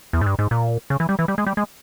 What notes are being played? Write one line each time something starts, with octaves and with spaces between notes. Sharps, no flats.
E2
G#2
G2
G#2
A#2
C#3
E3
G3
E3
G3
G#3
G3
G#3